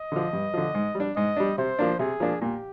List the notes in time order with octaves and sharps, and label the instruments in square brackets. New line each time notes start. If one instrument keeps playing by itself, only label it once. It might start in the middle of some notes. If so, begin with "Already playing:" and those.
Already playing: [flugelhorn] D#5
[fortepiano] D3 F3
G2
D3 F3
G#2
G3
D4
[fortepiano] G#2 [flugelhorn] D#5
[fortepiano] G3 D4
[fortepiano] C3 [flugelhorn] C5
[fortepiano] F3 A#3 D4
[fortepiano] C3 [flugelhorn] G#4
[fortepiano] F3 A#3 D4
[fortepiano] A#2 [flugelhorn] G4